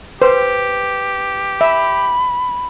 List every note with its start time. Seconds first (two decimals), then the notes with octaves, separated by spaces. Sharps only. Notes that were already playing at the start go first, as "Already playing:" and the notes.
0.22 G4 B4 C5
1.61 E5 B5